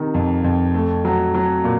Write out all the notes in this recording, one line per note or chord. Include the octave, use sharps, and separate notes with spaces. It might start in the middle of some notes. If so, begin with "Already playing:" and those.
Already playing: C3 D#3
F2
F2
A3
F#3
F#3
A#2